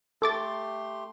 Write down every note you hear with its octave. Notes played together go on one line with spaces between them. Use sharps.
A3 G4 A4 C6 D6 A6